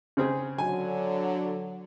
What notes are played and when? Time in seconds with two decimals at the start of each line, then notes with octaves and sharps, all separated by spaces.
0.17 C#3 C4 G#4
0.58 D3 F#3 G#5